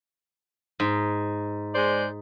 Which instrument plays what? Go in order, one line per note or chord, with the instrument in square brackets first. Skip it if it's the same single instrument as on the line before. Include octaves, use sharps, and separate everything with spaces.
[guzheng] G#2
[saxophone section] G#3 C5 D5